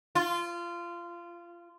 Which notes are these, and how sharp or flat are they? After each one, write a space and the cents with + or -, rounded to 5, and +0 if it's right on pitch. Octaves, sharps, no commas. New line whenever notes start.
F4 -20